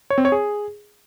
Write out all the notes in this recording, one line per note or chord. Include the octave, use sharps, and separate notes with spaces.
C#5
C4
C#5
G#4